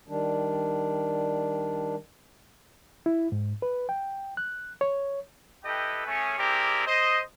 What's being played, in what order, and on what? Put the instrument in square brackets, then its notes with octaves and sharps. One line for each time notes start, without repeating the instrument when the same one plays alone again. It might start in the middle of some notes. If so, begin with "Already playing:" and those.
[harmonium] D#3 G3 D4
[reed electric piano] E4
G#2
B4
G5
F#6
C#5
[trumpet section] E4 G4 A4 B4 D#5 G5
A3 C#4 G#4
C4 E4 G4 G#4 A#4 D5
C5 D#5